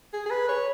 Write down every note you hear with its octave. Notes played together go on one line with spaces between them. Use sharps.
G#4
G#4
B4
C#5